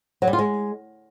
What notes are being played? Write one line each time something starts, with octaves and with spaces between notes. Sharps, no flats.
F#3
G3
F4
G#3